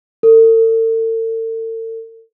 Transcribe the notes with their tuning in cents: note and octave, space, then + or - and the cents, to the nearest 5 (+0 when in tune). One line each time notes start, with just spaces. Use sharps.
A4 +45